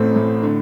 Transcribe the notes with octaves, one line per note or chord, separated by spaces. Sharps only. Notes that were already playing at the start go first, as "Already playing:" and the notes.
Already playing: A1 A2 A3 C4
A2
D3